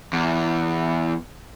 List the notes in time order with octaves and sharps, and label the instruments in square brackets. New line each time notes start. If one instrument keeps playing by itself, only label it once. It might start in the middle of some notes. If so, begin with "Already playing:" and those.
[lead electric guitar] E2